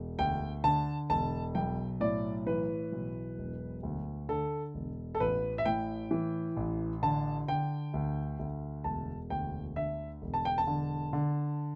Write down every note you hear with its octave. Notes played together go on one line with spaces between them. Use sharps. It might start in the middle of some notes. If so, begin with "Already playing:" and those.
Already playing: E1
D2 G5
D3 A5
E1 A5
B1 G5
A2 D5
E3 B4
B1
E1
D2
D3 A4
E1
A4
A1 B4
E5
A2 G5
E3
A1
D3 A5
D3 G5
D2
D2
E1 A5
D2 G5
D3 E5
E1
A5
G5
A5
D3
D3